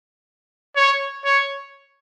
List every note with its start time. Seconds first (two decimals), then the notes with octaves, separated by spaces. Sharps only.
0.76 C#5
1.25 C#5